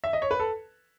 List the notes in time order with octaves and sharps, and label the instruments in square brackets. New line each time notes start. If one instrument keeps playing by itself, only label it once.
[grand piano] E5
D#5
C#5
B4
A4